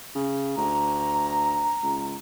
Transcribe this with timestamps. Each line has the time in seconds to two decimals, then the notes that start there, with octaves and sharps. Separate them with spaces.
0.15 C#3
0.57 D2 A#5
1.83 C#2